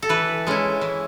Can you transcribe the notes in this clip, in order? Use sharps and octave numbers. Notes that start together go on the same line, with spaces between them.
A4
E3 B4
G#3 C#4 E4
E3